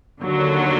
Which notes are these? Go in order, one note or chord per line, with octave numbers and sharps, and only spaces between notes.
D#2 D3 F#3